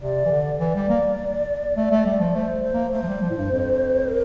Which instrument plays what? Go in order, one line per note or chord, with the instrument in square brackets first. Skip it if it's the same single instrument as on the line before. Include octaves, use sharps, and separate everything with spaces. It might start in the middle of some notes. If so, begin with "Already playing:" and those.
[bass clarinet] C3 [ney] D5
[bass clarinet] E3
D3
[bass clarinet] E3 [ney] D5
[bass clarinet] G3
A#3
A3
A3
G3
F3
[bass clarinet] A3 [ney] C5
[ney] C5
[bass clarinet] A#3
[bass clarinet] A3 [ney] C5
[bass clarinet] F3
G3
F3
A2
G2
F2
[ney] A#4